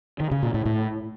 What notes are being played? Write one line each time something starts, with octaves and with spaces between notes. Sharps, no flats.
D#3
C#3
A#2
A2
A2